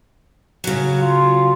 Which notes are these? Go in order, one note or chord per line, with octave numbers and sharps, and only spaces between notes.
C#3 F#3
F4